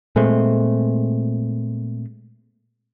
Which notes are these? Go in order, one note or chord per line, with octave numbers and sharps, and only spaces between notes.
A#2 G#3 A3 C4